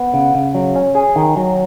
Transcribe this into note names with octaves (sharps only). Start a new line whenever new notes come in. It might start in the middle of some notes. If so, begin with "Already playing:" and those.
Already playing: B3
C#3
C#3
F#3
C#4
G#4
D#3
F#3